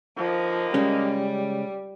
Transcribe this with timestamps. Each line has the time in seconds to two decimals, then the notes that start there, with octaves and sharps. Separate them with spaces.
0.17 D3 D#3 F3 A#3
0.74 C#3 G3 G#3 C#4